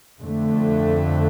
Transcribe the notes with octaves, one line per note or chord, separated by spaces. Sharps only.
F2 D3 A3